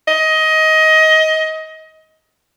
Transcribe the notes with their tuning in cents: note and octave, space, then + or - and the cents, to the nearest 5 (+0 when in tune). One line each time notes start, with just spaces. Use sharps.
D#5 +20